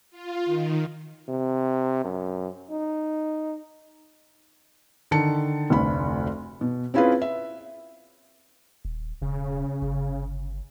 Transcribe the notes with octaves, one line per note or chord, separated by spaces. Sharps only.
F4
D#3
C3
F#2
D#4
D3 D#3 A5 C#7
F1 D2 B5
B2
C4 C#4 E4 F4 G#4 B4
E5
D#1
E1 C#3
G1